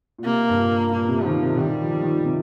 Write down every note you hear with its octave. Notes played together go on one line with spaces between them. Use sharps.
A#2
C3 A#3
G2
A#2
A#2 A#3
C3
D#3 F3
C3
C3
D#3 G3
F3
F3
D#3
C3